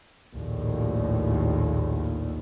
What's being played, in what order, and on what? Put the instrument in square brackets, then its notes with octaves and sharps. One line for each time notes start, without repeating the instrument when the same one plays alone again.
[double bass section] A#1 D#2 A2